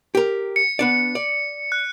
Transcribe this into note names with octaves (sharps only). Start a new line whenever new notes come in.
G4 A#4
C#7
B3 D4 D5
D5
F#6